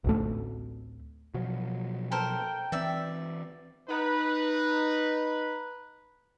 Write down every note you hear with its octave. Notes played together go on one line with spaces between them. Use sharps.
A1 D2 A3
B2 F3 F#3
A4 A#4 C5 G5
E3 C4 D5 E5
D#4 B4